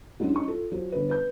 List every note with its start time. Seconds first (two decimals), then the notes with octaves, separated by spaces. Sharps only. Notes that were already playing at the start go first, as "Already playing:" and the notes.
0.20 F#3 G#3 C#4 D4 E4 F#4
0.33 F#2 D#4 C#6
0.48 F4 A4
0.72 F3 F#3
0.92 G1 B4
1.10 B4 G6